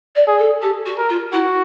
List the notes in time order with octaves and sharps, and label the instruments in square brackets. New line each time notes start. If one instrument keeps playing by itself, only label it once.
[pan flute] D5
[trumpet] G#4
[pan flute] A4
[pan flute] G4 [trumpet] A4
[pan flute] F#4
[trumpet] A#4
[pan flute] F4
[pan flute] E4 [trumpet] F#4